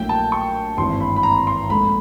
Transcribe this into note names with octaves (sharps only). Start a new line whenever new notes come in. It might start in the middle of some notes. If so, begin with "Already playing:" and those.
Already playing: A#1 A2 F#3 A#3 G5
A5
C#6
G#1 G2 E3 G3 C4 C6
B5
B5
A#5
C6
A#1 G#2 F3 A3 B5